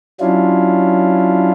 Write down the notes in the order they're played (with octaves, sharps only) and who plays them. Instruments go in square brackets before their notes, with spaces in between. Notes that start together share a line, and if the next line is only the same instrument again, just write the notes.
[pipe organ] F#3 C#4 D4 E4 F4